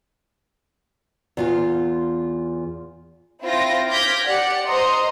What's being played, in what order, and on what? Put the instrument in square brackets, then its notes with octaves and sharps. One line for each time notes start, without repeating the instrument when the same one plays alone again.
[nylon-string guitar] E2 F4 F5
[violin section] C4 E4 F4 G5 A#6
D6 F6 G6 G#6 A#6 B6
G4 D5 F#5 C#7
C5 D#5 A#5 C6